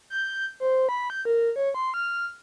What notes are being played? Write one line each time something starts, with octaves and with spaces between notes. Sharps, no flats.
G6
C5
B5
G6
A#4
C#5
C6
F6